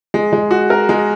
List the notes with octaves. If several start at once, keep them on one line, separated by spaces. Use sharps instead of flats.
G#3
G#3
F#4
A#4
G#3